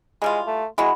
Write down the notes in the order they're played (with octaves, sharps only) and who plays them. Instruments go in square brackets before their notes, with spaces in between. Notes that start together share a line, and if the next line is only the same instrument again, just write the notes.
[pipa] E3 G3 F4 [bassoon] G#3
[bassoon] A3
[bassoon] G#3 [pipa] E4 F#4